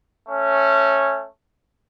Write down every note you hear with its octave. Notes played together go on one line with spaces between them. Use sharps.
A3 C#4